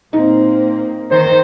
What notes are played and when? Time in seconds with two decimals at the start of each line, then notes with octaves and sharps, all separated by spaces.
0.13 A#2 A#3 C4 D#4
1.11 D#3 C5